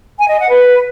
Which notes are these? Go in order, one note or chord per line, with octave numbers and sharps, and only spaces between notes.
G#5
D#5
F#5
B4